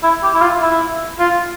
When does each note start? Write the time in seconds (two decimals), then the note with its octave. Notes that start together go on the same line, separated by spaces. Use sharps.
0.03 E4
0.23 G4
0.34 E4
0.42 F4
0.61 E4
1.19 F4